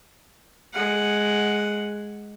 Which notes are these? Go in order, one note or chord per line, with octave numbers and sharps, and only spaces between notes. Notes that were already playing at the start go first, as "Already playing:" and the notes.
G#3 F#5